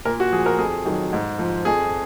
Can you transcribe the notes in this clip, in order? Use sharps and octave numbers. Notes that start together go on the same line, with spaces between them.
A#2 A#4
F#4
F3 G#4
A#4
F2 G#4
D#3 F#3
G#2
F3
F2 G#4